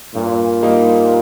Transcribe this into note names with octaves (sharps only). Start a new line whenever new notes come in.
G2 A#2
G3 A#3 D#4